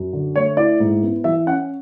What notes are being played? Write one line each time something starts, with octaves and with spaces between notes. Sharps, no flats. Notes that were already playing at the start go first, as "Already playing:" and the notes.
Already playing: F#2
D3
A3 C#5
E4 D5
G#2
B3
E3 E5
C#4 F#5